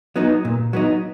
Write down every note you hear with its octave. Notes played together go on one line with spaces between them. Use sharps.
F#3 B3 D#4
A#2
F#3 B3 D#4